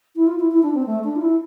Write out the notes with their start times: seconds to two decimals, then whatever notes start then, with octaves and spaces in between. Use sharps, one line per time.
0.16 E4
0.27 F4
0.39 E4
0.51 E4
0.63 D4
0.74 C4
0.86 A3
1.04 D4
1.16 F4
1.21 E4